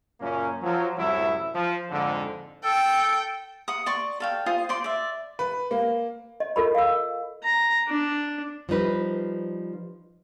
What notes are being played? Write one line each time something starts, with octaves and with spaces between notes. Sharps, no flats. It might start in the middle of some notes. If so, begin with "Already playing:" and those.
F#2 A#2 C#3 A#3 C#4
F3 F#3
C2 F#2 A2 F#3 E4
F3
F2 G#2 D3
A4 G5
F#5 D#6
D5 C6 C#6
A4 F5 G5
F4 C5 G#5 D#6
C5 D5 C6
D5 E5
B4
A#3
D#5
F4 A4 A#4 D#5 B5
F5 E6
A#5
D4
F3 G3 D#4 B4